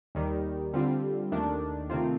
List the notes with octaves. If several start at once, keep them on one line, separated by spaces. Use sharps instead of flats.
D#2 D#3 G3
D3 G3 C4 F4
D#2 D#3 A3 D4
C3 D#3 A3 C4 F4